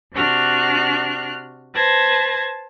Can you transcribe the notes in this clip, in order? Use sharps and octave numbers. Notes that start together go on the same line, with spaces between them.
C3 D4 F#4 F6 F#6
B4 C5 A5 G#6 A#6